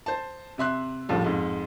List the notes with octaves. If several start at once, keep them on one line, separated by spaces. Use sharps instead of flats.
C5 A5
C3 E5 C6 F#6
A#1 A2 F3 G3
F2 G#2